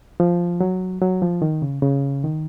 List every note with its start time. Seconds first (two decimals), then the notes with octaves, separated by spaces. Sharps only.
0.20 F3
0.61 F#3
1.02 F#3
1.22 F3
1.42 D#3
1.62 C#3
1.83 C#3
2.24 D#3